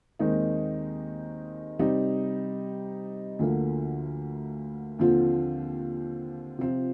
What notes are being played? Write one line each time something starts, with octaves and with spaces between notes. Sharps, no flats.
D#2 D#3 G#3 C4 D#4
C3 G3 C4 D#4
D2 D3 F3 A#3
D#2 D3 F3 C4 F4
C3 F3 C4 F4